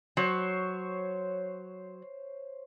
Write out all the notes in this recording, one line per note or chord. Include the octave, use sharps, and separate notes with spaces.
F#3 C5 C#5 C#6